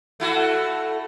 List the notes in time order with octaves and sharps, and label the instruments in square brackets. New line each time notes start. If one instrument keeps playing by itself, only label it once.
[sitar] A3 E4 F#4